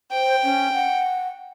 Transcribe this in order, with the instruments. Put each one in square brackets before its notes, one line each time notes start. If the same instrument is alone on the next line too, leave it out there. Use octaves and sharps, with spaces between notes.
[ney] C5 [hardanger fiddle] G5
[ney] C#4
F#5